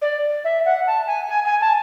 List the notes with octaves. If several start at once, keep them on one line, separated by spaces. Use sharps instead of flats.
D5
E5
F#5
A5
G#5
G#5
G#5
A5